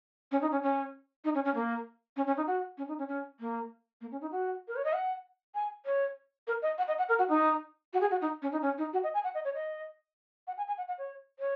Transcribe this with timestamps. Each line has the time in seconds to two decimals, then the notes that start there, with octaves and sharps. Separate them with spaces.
0.32 C#4
0.42 D#4
0.52 C#4
0.63 C#4
1.24 D#4
1.35 C#4
1.45 C#4
1.55 A#3
2.17 C#4
2.27 C#4
2.37 D#4
2.47 F#4
2.78 C#4
2.88 D#4
2.99 C#4
3.09 C#4
3.40 A#3
4.01 A#3
4.12 C#4
4.21 D#4
4.32 F#4
4.68 A#4
4.76 C#5
4.85 D#5
4.93 F#5
5.55 G#5
5.86 C#5
6.47 A#4
6.62 D#5
6.78 F#5
6.88 D#5
6.98 F#5
7.09 A#4
7.19 F#4
7.29 D#4
7.93 F#4
8.01 G#4
8.11 F#4
8.22 D#4
8.42 C#4
8.52 D#4
8.62 C#4
8.78 D#4
8.93 F#4
9.04 D#5
9.14 G#5
9.24 F#5
9.35 D#5
9.45 C#5
9.55 D#5
10.47 F#5
10.57 G#5
10.68 G#5
10.78 F#5
10.88 F#5
10.98 C#5
11.39 C#5